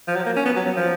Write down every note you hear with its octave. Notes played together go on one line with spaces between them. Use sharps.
F3
F#3
A#3
C#4
B3
F#3
F#3
F3